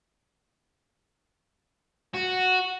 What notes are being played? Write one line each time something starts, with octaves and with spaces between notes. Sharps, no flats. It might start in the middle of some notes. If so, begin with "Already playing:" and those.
F#4